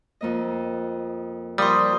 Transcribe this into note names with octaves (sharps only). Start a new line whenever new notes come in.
F2 A#3 D#5
F3 G3 A#3 A#4 C6 D#6